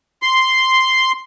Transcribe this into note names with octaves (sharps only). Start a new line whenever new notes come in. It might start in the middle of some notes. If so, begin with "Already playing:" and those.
C6